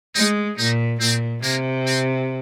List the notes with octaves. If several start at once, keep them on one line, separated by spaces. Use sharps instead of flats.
G#3 D#4
A#2 D#4
A#2 C4
C3 A#3
C4